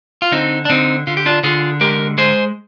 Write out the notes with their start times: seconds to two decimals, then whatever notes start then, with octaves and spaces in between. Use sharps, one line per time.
0.22 F4
0.32 D3 C4 D#4
0.65 D4
0.69 D3 C4 D#4
1.07 D3 F4
1.17 G4
1.26 D4 F4
1.43 D3 F4 G#4
1.81 G#3 G4 A#4
2.18 G#3 G#4 C5